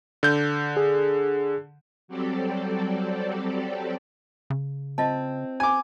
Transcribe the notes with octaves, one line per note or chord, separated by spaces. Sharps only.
D3 G6
G#4
F#3 G3 C4 G4 A4 D5
C#3
C4 F4 D#5 A5
G#5 D6